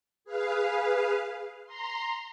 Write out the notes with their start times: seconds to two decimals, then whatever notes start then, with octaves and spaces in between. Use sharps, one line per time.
0.25 G#4 B4 F5
1.66 A#5 C6